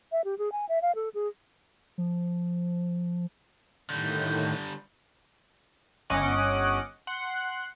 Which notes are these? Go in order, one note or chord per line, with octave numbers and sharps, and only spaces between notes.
E5
G4
G#4
G#5
E5
F5
A4
G#4
F3
A2 D3 D#3 G3 G6
G1 C#4 D#5 F#5 D6
F#5 C6